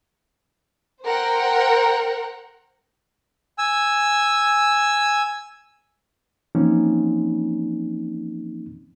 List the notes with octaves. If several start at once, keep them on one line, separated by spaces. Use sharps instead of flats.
A#4 C5 F#5 G5
G#5 E6
E3 F3 A#3 C4 C#4 D#4